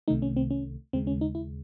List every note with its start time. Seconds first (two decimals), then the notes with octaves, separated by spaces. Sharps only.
0.08 C2 C3 D#3 A3 D#4
0.22 C#4
0.37 C4
0.50 C#4
0.93 D#2 C#3 G#3 C4
1.07 C#4
1.21 D#4
1.35 E4